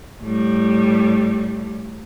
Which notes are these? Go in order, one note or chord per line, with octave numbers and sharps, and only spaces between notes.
A2 G3